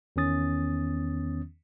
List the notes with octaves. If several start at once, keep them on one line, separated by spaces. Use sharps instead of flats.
E2 D#3 B3 C#4 D#6 A6